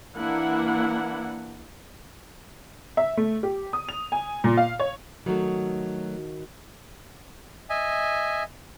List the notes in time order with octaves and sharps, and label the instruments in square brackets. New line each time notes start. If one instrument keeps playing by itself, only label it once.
[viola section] E3 A#3 D4 E4 F#5
[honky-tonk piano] E5
A3
G4
D#6
F7
G#5
A#2
F5
C#5
[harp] D#3 F#4 [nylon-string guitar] F#3 A3
[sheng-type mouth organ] D#5 E5 G#5